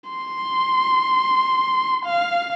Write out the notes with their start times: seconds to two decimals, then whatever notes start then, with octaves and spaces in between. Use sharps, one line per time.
0.10 C6
2.06 F5